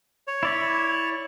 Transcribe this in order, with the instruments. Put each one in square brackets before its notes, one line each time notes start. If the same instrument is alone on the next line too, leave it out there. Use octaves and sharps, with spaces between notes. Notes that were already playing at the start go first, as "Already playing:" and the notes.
[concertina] C#5
[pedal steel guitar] E4 D5 E5